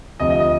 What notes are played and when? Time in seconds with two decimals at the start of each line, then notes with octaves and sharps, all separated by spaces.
0.20 D2 C3 F3 D#5
0.30 D#5
0.40 D#5